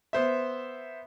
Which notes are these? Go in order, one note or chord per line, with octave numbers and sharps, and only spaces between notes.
B3 C5 E5